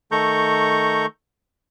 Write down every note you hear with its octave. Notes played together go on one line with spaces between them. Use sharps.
D#3 A3 A4 A#5 C#6 G6